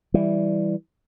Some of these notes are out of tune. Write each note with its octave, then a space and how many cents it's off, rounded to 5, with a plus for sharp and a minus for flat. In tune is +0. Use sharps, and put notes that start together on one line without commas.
E3 +0 G3 +0